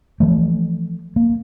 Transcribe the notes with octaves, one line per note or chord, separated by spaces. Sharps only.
E3 F3 A3
A#3